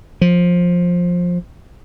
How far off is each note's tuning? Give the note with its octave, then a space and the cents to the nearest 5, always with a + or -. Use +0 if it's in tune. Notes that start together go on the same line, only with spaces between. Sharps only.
F3 +15